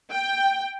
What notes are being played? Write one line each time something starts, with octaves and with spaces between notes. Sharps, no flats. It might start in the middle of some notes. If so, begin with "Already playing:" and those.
G5